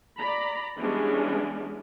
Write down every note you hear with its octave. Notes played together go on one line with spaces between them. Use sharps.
D5 A#5 B5
E3 G3 G#3 B3 C#4 D4